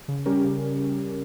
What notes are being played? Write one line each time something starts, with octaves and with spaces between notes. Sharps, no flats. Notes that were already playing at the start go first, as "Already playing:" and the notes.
C#3
G3 C#4 G4 A#4
C#3